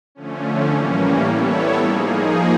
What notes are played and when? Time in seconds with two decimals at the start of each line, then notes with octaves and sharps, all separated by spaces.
0.15 D3 F3 A3 C#4
0.68 A2 E3 G3 A#3 C#4
1.22 G3 B3 E4 A4 C#5
1.76 F3 A#3 D#4 G#4